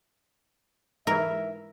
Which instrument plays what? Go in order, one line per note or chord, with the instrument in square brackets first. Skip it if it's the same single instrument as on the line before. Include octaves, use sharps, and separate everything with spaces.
[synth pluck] G#2 E3 [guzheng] A#4 [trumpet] E5